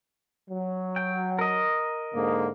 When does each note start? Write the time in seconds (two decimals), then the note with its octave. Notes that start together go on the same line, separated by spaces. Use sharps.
0.49 F#3
0.96 G5
1.39 A#4 D#5
2.14 G#2 D3 A#3